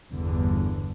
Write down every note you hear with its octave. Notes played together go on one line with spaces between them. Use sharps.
G1 E2 D3